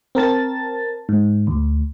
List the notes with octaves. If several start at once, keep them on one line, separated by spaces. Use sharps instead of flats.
C4 A#4 A5 A6
G#2
D2